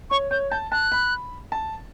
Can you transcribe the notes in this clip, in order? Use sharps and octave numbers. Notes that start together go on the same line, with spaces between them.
C#5 C#6
C#5 G6
A5 G6
A5 F#6
B5
A5